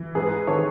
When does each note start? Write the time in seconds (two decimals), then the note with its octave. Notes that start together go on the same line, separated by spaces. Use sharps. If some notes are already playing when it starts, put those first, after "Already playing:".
Already playing: E3
0.15 G#2 G#4 B4
0.47 D#3 A4 C#5